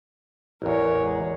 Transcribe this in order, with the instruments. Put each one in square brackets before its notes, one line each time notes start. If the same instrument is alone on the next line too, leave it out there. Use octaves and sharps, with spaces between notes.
[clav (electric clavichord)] A1 E2 [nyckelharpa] A#4 C#5
[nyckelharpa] G#3